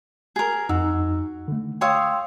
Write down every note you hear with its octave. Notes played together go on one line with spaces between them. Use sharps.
G#4 A#4
F2 D#4 F#4 E6
D3 A3
C#5 F5 G5 C6 D#6 E6